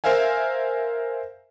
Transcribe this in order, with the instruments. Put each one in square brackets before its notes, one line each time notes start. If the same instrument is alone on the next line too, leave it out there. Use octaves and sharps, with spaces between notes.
[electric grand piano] A#4 C5 E5 F5 G#5